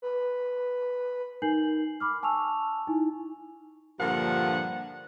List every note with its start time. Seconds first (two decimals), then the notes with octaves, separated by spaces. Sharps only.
0.02 B4
1.42 D#4 A#4 G#5 G6 C7 F#7
2.00 B5 D6 F6
2.23 G#5 A5 C#6 E6 F7
2.87 D#4 E4 G#5
4.00 G2 A#2 D3 F3 A#3 F#5